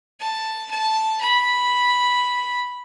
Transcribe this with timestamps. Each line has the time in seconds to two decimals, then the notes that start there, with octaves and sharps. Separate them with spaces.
0.20 A5
0.71 A5
1.21 B5